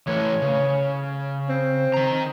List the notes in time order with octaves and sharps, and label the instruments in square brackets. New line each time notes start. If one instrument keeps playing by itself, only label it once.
[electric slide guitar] E3 A3 B4 [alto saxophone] C#5
[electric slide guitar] C#3
[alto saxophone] C4
[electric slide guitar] D#3 A#5